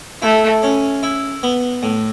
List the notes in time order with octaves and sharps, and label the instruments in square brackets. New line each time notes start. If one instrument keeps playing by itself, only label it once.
[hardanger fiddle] A3 [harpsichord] E4
[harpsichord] C#4
E4
B3
A2